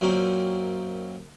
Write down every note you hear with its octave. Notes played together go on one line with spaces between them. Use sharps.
F#2 A#2 C4 C#4 D#4